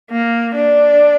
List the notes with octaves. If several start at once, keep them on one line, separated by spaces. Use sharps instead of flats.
A#3
D4